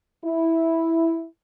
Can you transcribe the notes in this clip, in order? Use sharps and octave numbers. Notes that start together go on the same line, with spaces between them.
E4